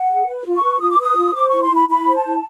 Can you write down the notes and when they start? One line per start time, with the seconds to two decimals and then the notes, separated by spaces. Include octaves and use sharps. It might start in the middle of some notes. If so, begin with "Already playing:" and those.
Already playing: F#5
0.10 G#4
0.27 B4
0.46 F4
0.54 C#6
0.63 B4
0.81 F4 D#6
0.91 D6
0.99 B4 D#6
1.17 F4
1.34 C5 D6
1.49 E4 C#6
1.61 C6
1.71 E4 B5
1.88 E4 B5
2.07 C5
2.16 A5
2.25 E4